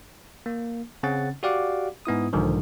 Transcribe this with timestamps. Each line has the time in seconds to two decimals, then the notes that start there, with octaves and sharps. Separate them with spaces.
0.46 A#3
1.03 C#3 C4 C#4 F#5 A6
1.43 F#4 G4 D5 F5 F#5 D6
2.05 G#2 B3 E4 D#6
2.33 B1 G#2 D3 D#3 F3